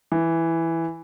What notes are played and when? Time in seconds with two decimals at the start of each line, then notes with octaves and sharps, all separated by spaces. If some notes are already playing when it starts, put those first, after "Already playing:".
0.12 E3